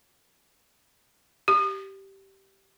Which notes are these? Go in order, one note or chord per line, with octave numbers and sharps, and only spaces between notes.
G4